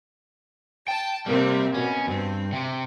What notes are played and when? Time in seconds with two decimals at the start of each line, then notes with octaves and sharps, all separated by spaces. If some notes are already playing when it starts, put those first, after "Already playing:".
0.88 G5 A5
1.26 C3 G3 A#3 C4
1.74 B2 C#4
2.07 E2 G2 C4
2.53 C3 G4